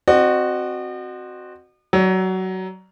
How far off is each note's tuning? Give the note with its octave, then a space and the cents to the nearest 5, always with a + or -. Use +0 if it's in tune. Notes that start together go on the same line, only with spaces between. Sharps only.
C4 +5 F#4 +0 D#5 -40
F#3 +20 D5 +0